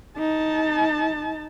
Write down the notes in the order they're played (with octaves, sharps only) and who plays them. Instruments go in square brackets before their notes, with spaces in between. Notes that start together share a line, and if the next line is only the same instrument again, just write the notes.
[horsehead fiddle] D#4 A5